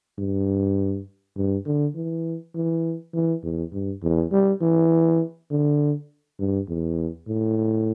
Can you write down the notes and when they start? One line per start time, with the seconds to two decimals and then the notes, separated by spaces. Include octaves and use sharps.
0.18 G2
1.36 G2
1.66 D3
1.95 E3
2.55 E3
3.14 E3
3.43 E2
3.73 G2
4.03 E2
4.32 G3
4.62 E3
5.51 D3
6.39 G2
6.69 E2
7.28 A2